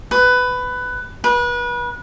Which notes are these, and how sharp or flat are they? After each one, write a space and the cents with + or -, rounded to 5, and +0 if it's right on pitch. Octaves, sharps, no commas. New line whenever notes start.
B4 +15
B4 -30